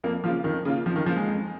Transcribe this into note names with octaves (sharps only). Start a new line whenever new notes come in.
F2 A#3
C#3 F3 A#3 F4
F2 D#3
C#3 A#3 F4
F2 F3
D#3
C#3 F3 A#3 F4
G#3
F2